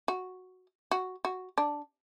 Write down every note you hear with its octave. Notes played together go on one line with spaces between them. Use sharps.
F#4
F#4
F#4
D4